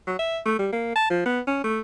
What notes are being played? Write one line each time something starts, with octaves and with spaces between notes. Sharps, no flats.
F#3
E5
A3
G3
A#3
A5
F3
B3
C#4
A3